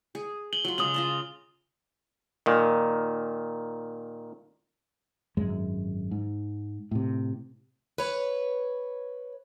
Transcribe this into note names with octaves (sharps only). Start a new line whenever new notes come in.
G#4
G#5 F#7 G7
F#3 F4
C#3 G#3 C#4 D#6 F#7
F4 D#5 A5
A#2 D#3
G#1 F#2 G#3
G#2
A2 C3
B4 C#5